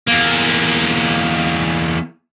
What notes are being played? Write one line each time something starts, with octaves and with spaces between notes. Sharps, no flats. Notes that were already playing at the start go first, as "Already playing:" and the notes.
E2 A#3